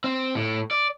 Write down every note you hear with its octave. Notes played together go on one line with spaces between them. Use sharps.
C4
A2
D5